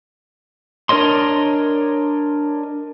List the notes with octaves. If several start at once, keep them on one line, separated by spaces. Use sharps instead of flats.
D4 A#4 C#5 D#5 C6